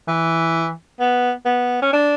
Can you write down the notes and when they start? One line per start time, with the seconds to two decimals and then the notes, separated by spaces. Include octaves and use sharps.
0.08 E3
1.00 B3
1.45 B3
1.82 C#4
1.93 D4